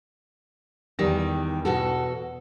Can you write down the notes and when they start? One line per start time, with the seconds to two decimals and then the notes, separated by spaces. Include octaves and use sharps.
0.99 E2 D#3 G3 D#6 A#6
1.65 B2 F#4 A4